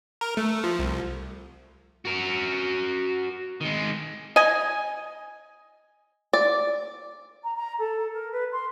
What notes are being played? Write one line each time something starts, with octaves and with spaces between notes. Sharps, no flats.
A#4
A3
F3
C2
F#4 A#4
D#3 G#3
D#5 G#5
D5
A#5
A#5
A4
A#4
B4
C6